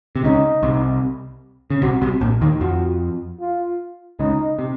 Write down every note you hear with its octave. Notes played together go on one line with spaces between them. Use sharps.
C3
C#2 C#3 D#4
C2 C3
C#3
C2 C3 F#4
C2 C3
A#1 A#2
D#2 D#3
F2 F3 F#4
F4
C#2 C#3 D#4
C3